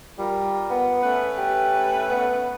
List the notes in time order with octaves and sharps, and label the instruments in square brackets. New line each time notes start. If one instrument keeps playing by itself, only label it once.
[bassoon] G3 [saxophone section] F4 A#4
[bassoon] B3
[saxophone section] A3 C#4 B4
[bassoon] G4
B3